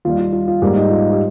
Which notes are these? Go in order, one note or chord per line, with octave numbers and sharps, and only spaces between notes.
D#2 D#3 G3 F4
F4
F4
F4
G#2 G3 A#3 D#4 G4
D#4
F4
G4